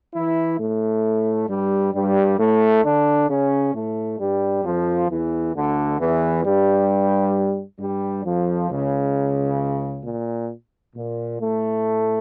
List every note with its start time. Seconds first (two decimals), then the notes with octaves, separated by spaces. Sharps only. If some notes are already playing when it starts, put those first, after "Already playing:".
0.14 E3 E4
0.59 A2 A3
1.49 G2 G3
1.94 G2 G3
2.39 A2 A3
2.84 D3 D4
3.29 C#3 C#4
3.74 A2 A3
4.19 G2 G3
4.64 F2 F3
5.09 E2 E3
5.54 D2 D3
5.99 E2 E3
6.44 G2 G3
7.80 G2 G3
8.24 F2 F3
8.69 C#2 C#3
10.04 A#2
10.95 A#2
11.40 A2 A3